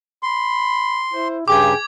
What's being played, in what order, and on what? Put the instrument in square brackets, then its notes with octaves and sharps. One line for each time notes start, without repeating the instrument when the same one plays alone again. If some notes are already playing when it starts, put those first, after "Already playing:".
[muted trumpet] B5 [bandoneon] C6
[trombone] E4 [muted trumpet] C5
[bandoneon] G2 C#3 G4 [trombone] G#4 [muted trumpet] G5 [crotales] D6 G#6